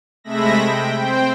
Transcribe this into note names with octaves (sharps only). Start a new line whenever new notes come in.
C3 G#3 A3 E5 B5 A#6
G5
C4 C5 G5